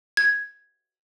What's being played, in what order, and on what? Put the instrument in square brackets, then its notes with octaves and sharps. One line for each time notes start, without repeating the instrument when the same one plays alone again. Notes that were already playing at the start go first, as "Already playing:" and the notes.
[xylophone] G#6